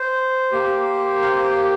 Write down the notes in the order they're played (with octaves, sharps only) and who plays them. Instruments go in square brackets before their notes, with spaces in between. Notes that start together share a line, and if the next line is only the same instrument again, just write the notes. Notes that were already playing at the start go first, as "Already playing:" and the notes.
Already playing: [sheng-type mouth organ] C5
A#3 G4
F5